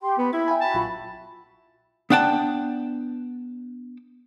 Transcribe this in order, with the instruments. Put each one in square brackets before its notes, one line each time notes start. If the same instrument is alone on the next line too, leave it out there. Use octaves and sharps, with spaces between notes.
[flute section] G4 G5 C6
[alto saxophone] B3 [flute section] B5
[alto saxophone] E4 [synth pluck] G#6
[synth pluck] E5 G5 G#5
[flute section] F#4 B5 [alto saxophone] A5
[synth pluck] A#1 F#3 F4
[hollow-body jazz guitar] B3 D4 F#5 G5 A5